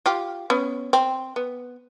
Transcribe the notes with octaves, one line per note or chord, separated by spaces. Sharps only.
F4 G4
B3 C#4
C4
B3